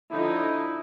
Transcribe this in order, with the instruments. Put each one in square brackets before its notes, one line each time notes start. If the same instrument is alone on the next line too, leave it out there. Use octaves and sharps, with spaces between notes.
[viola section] D3 F3 D#4 [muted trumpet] E4